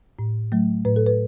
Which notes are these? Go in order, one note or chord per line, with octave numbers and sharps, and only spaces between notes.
A2
F#3 A3
A2 B4
A4
B4